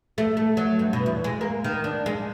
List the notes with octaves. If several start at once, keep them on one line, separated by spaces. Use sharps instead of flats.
A3
A3
F#3
G2
B2
E2
G#3
A#3
D#3
D4
G#3